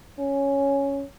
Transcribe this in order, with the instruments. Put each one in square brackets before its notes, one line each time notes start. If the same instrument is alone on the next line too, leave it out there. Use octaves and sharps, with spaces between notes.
[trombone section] C#4